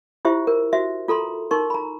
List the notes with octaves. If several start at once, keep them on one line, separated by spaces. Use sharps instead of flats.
E4 F4 G4 C5 E5
A#4
F#4 C5 E5
F4 A4 A#5 C6
D#4 A#4 C6 C#6
A#5 B5